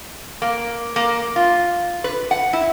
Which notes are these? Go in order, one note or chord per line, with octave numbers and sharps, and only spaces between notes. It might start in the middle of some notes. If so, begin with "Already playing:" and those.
A#3
A#3
F4
B4
F#5
E4